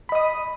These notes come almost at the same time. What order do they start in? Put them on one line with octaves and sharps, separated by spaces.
B5 D#5 D#6